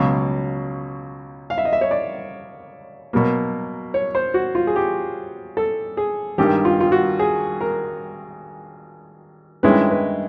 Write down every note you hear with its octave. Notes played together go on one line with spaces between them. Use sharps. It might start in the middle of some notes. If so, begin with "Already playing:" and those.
Already playing: C#2 B2 F#3 F5
F5
E5
D#5
E5
C#5
D5
B2 F#3 A#3
C#5
C5
F#4
F4
G#4
G4
A4
G#4
G#1 G2 D#3 G4
F4
F4
F#4
G#4
A#4
G2 D#3 G#3 C#4 E4 B4
B4